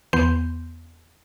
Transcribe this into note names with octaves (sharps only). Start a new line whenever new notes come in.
E2 B3 C6 G6